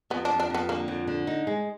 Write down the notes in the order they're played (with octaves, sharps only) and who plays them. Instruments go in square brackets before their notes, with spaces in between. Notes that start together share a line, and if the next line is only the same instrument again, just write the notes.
[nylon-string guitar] F2 [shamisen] B3
[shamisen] D4
[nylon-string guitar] F2
[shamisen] D4
[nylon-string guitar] F2 [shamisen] B3
[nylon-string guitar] D3 [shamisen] A#3
[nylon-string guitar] F2
D3
D#4
G#3